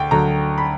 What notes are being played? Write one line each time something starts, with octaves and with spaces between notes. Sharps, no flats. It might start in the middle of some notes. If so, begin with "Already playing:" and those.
Already playing: D2 G5
D2 D3 F#3 A#5
B5